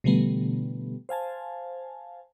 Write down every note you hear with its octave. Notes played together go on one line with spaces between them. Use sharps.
B2 D3 E3 G3 A3 B3
C5 F5 G#5 A5